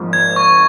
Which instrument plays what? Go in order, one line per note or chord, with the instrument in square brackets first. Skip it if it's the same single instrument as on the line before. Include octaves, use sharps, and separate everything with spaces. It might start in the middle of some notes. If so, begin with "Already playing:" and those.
Already playing: [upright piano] G#1 G#2 F3 A#3
[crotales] G#6
C#6